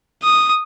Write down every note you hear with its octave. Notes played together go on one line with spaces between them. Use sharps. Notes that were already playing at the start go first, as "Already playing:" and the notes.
D#6